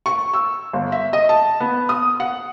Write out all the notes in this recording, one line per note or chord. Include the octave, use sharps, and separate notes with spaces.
C#6
E6
G1
E5
D#5
A5
B3
D#6
F#5